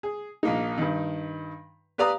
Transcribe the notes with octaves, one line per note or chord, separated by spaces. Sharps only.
G#4
A#1 A#3 D#4
G2 D#3
G4 B4 D5 F5 A#5 D#6